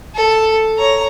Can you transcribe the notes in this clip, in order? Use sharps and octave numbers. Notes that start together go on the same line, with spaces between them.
A4
C#5 A#5